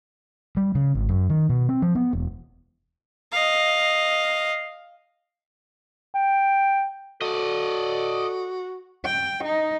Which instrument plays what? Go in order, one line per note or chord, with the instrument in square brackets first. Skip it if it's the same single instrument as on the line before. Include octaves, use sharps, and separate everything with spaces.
[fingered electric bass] G3
C#3
G#1
F#2
D#3
B2
C4
F3
B3
E1
[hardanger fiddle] D#5 F5
[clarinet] G5
[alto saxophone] F#4 [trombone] A4 [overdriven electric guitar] D5 D#5
[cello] G5
D#4